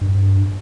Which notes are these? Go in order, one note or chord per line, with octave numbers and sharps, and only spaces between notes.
G2